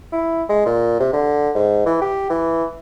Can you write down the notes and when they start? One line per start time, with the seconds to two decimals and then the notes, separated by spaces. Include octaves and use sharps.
0.12 E4
0.49 G#3
0.66 A#2
1.00 C3
1.13 D3
1.55 G#2
1.86 E3
2.01 G4
2.30 E3